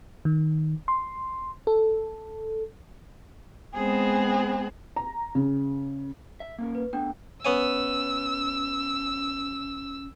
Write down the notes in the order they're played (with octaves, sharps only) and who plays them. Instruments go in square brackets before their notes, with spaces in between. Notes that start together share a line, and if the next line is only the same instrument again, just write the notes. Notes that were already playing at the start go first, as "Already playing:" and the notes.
[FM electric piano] D#3
C6
A4
[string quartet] G#3 B3 C4 G#4
[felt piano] A#5
C#3
[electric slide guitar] E5
A#3 C#4 A#4
[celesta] B4
[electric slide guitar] A3 B3 [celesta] D4 G5
[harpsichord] B3 C#5 G#5 [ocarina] C#4 [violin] E6